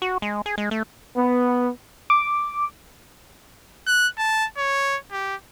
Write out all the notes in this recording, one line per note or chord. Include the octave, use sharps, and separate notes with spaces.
F#4
G#3
G#4
G#3
A3
B3
D6
F#6
A5
C#5
G4